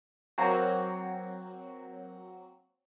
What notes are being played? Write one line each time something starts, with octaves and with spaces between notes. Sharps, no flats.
F#3 A#3 C4 F#4